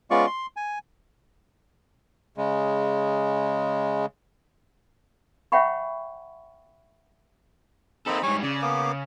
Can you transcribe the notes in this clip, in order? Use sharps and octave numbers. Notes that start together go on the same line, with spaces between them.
G#3 B3 C#4 F4 D5 C#6
C6
G#5
C#3 G#3
C#5 E5 F#5 G5 B5 C#6
A#3 C4 D#4 A4 B5
G#2 G3 C#5 G#5
C#3 D5
A#3 B3 D6